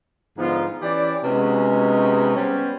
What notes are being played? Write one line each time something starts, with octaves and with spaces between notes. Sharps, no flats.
G#2 D3 F3 B3 D#4 F4
E3 C#4 G4 D5
C3 G#3 B3 C#4 D#4 F#4
G3 B3 C#4 C5